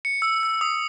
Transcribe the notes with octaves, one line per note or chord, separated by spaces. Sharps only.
C#7
E6
E6
D#6